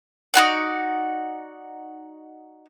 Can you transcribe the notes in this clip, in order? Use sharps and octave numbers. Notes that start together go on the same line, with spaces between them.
D#4 F4 F#4 D5